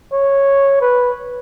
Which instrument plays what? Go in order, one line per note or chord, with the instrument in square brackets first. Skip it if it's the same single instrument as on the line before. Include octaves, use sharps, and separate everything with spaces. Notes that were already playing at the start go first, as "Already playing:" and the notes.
[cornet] C#5
B4